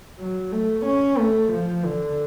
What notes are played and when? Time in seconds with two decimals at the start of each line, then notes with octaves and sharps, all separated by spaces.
0.19 F#3
0.52 A3
0.85 C#4
1.18 A3
1.52 F3
1.85 D3